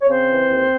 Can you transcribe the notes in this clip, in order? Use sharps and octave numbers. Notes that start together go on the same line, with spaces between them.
C#5
C#3 C4 C5
E3
D#2